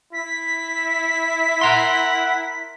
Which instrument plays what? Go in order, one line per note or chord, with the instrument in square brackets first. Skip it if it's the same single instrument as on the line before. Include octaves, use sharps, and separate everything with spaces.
[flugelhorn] E4 [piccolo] B6
[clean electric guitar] A#4 A#5 C6 [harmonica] F#5